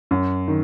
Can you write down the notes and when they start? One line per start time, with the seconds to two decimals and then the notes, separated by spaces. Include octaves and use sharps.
0.11 F#2
0.48 D#3